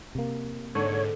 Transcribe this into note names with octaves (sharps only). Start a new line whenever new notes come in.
C3 A#3
G#2 D3 C#5